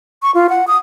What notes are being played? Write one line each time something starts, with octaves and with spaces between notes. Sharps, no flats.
C#6
F4
F#5
D#6